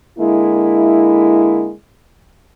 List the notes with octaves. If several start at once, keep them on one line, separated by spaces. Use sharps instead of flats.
D3 G#3 A#3 E4